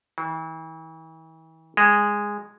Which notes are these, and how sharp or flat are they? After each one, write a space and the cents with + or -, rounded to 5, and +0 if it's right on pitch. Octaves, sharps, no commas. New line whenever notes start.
E3 -40
G#3 -10